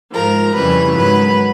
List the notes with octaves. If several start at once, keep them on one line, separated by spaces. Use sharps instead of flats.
G#2 F3 A#4
F2 C#3 E3 G3 B4
G#2 D#3 F#3 B4